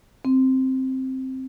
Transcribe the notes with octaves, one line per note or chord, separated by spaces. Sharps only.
C4